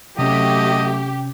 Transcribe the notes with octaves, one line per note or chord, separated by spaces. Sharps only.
C3 F#3 A3 C#4 G4 D#5